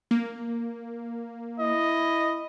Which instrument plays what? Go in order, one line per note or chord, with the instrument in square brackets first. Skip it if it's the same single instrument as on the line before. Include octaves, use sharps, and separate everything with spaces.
[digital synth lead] A#3
[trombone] E4 [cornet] D#5